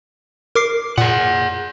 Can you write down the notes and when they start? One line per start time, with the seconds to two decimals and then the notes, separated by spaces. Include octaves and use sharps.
0.56 A#4 D6 C7
0.98 A#2 G#4 F#5